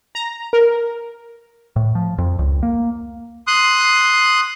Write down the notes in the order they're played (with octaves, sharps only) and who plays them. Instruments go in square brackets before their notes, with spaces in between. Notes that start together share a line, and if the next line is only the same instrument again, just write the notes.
[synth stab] A#5
A#4
[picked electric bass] A2
F3
F2
C#2
A#3
[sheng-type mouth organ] C6 D#6 F#6